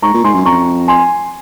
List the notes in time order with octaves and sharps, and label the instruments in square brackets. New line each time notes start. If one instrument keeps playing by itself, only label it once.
[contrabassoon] G#2 [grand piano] A#5 C#6
[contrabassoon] A#2
[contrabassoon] G#2 [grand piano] G#5 C6
[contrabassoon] F#2
[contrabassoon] F2 [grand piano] A#5 C#6
[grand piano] G#5 C6